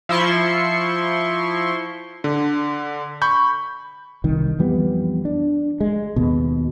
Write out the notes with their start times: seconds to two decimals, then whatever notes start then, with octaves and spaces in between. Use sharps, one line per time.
0.09 F3 E4 C6 C#6
2.24 D3
3.22 B5 C#6 G6
4.24 C2 D#3
4.59 F2 E3 G3 B3
5.25 D4
5.81 G#3
6.16 D#2 B2